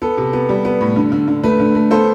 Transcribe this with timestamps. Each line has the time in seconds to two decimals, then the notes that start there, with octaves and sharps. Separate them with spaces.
0.02 B3 A4
0.18 C3
0.33 B3
0.49 G3
0.65 B3
0.81 A2
0.96 D3
1.12 D3
1.28 D3
1.43 A3 B4
1.60 D3
1.75 A3
1.91 B3 A4 C5